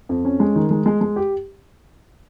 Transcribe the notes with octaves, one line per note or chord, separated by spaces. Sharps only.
F2
C#4
G#3
D#3
G#3
G#3
G#3
G4